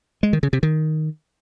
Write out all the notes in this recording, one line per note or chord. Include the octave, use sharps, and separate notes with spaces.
G#3
D#3
C#3
C3
D#3